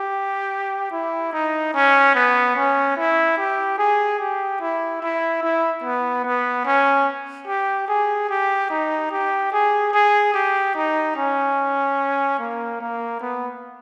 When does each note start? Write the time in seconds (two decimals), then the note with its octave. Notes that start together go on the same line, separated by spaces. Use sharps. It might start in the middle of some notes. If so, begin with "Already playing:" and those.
Already playing: G4
0.92 E4
1.33 D#4
1.74 C#4
2.15 B3
2.55 C#4
2.97 E4
3.38 G4
3.78 G#4
4.19 G4
4.61 E4
5.02 E4
5.43 E4
5.84 B3
6.25 B3
6.65 C#4
7.47 G4
7.88 G#4
8.29 G4
8.70 D#4
9.11 G4
9.52 G#4
9.93 G#4
10.34 G4
10.75 D#4
11.16 C#4
12.39 A#3
12.80 A#3
13.21 B3